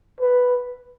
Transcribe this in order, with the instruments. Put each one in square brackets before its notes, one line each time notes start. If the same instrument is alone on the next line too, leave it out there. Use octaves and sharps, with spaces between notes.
[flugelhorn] B4